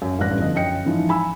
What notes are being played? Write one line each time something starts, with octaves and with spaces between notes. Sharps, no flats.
F#2
A1 G2 D5 F#6 A#6
E2 D3 F3 D#5
F#2 D#5 G5 C#7
G#2 E3 F3
G#5 B5 E6